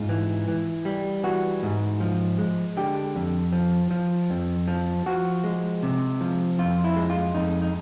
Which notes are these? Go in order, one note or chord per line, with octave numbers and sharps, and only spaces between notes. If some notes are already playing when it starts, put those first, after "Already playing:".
Already playing: G#2 F4
E3
E3
G3
E3 F#4
G#2
F3
G#3
D3 G4
F2
F3
F3
F2
F3
F3 F#4
G#3
C3
F3
F2 F4
E4
G#3
F4
F2 D#4
D#4